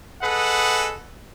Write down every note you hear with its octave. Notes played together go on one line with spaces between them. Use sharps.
G#4 A4 B4 D#5 F#5